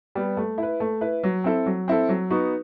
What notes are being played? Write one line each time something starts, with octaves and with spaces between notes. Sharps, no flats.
G3 B3
A3
E4 B4
A3
E4 B4
F#3
C4 E4 A4
F#3
C4 E4 A4
F#3
B3 D#4 F#4